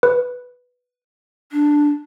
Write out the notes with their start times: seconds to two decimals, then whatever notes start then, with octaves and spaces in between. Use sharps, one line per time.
0.03 B4
1.52 D4